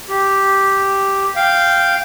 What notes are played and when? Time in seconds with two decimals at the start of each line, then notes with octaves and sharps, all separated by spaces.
0.09 G4
1.36 F5 G5